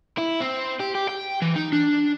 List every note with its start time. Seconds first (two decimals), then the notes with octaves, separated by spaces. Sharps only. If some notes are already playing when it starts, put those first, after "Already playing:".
0.18 E4
0.41 C4
0.80 G4
0.95 G4
1.09 G5
1.42 E3
1.56 D#4
1.73 D4